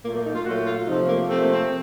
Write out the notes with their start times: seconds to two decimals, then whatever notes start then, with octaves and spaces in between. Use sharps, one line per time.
0.04 A#2 F#3 A3 A#3
0.15 A#3
0.25 D#4
0.35 F4
0.44 A#2 F#3 A3 F#4
0.65 F4
0.86 C3 F3 A3 D#4
1.07 A#3
1.27 C3 F3 A3 C4
1.39 A#3
1.51 C4